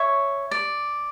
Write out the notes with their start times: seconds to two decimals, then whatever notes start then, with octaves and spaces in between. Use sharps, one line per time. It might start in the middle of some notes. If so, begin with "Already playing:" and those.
Already playing: C#5 E5
0.51 D5